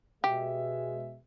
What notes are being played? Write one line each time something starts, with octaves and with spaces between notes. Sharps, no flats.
B2 G#3 G4 E5